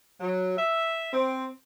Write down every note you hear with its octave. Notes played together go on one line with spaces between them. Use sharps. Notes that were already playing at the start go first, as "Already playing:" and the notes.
F#3
E5
C4